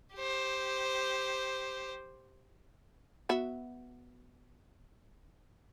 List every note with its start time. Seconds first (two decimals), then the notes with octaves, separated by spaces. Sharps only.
0.14 G4 C5
3.29 B3 F#4 E5